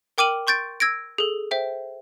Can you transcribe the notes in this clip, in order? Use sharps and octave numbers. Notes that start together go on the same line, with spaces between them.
A#4 G5 D6 F6 D#7 F#7
C6 C#6 G6 A6 D7
E6 G#6 A#6 D7
G#4 A4
C5 E5 G5